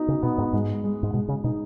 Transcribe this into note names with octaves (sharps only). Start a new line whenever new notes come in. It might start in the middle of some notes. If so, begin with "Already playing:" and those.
Already playing: B3 D#4 F#4
C#3
B2 B3
G#2
G#2 G#3
G#3
G#2
B2 G#3
C#3
B2 D#4